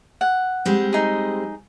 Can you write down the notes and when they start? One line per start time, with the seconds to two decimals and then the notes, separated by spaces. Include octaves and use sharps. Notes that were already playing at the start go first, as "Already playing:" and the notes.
0.21 F#5
0.66 G3 G#3 C4
0.93 D#4 G#4